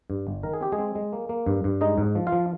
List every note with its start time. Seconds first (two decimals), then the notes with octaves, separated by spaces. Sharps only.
0.10 G2
0.27 G1
0.43 D#3 A#4
0.53 G#4
0.61 C4 G4
0.72 G#3 G#4
0.78 C4
0.95 G#3
1.13 A#3
1.29 A#3
1.47 G2
1.64 G2
1.81 G#3 D#4 D#5
1.98 G#2
2.15 F3
2.27 F4 F5
2.32 F3